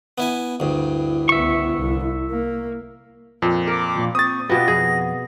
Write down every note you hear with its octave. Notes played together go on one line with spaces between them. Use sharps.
B3 E4 G#5
D2 G2 E4
C#2 B3 E5 C#6
C2
A#3
F2 A#2
A#4 D6
A#2 F3
C4 C#6 D#6 A6
B2 B3 F4 G4 A#6
F2 G#4